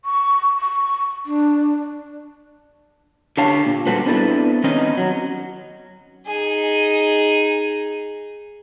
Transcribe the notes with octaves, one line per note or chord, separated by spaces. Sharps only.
C#6
C#6
D4
D3 D4 G4 C#5 F5 A5
A#2
D3 G3 F#4 A4 B4 C5
B3 C4 D4 E4 A4 B4
D#3 C4 C#4 D#4 B4 D#5
F#3
D#4 G#4